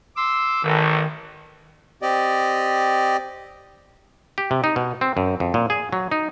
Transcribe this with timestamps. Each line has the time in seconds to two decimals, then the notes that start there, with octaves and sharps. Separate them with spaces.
0.17 C6 D6 E6
0.63 A1 D#3
2.02 C4 G4 D5 D#5
4.38 G4
4.51 C3
4.64 D#4
4.76 B2
5.01 C4
5.17 F#2
5.40 F2
5.54 A#2
5.70 G#4
5.93 F#3
6.12 D#4